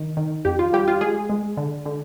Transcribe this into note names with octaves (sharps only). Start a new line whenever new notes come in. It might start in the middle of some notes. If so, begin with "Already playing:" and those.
Already playing: D#3
D#3
F2 G4
F4
G3 G4
F4
G#3 G#4
G#3
D3
D3